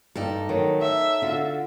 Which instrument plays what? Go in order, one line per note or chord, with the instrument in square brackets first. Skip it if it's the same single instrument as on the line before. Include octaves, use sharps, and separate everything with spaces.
[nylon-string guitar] G2 D5 [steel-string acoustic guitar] D#4 A4
[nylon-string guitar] D#3 F#3 A3
[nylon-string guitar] C#5 [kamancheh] E5
[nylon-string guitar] D3 F4 F#4